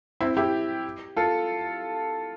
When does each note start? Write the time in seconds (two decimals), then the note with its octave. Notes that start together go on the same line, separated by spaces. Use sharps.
0.21 C4 E4
0.37 E4 G4
1.17 F4 A4